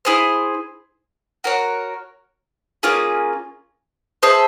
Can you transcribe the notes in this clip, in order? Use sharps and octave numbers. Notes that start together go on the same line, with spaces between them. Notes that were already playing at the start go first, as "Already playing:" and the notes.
E4 G#4 C5
F#4 A#4 C#5
A#3 C#4 F4 G#4
G#4 C5 E5 A5